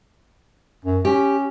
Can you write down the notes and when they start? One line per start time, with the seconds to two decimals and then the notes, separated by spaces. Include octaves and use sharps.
0.85 F#2
1.05 C#4 G4